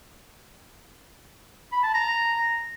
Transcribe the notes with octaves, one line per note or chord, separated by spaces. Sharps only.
B5
A5
A#5